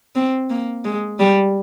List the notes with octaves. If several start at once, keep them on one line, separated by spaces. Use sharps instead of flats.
C4
A#3
G#3
G3